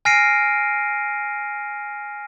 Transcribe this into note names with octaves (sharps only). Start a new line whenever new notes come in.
G#5 F6 A#6 C7 D7 D#7